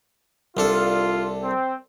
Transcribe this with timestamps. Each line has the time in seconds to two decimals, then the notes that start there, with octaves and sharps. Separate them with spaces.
0.57 C2 D4 F4 A4
1.43 C4